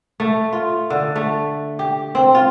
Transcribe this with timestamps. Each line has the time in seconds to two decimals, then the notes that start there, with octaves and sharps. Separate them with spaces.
0.20 A3
0.53 F4
0.90 D3
1.16 A3
1.79 G4
2.15 C4
2.35 F4